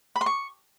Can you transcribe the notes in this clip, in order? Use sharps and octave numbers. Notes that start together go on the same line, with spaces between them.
B5
C6
C#6